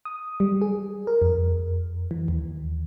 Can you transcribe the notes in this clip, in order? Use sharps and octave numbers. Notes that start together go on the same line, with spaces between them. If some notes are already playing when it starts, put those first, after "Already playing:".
D#6
G3
G#4
A#4
F2
E3
D#2